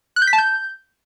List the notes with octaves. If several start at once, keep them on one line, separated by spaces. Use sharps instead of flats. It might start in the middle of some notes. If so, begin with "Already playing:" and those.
F#6
G6
B6
A5
G6